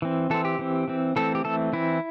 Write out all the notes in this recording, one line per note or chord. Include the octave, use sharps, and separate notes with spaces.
E3 C4
E3 C4 A4
G4
E3 C4
E3 C4
E3 A3 C4 A4
G4
E3 A3 C4 A4
E3 C4 E4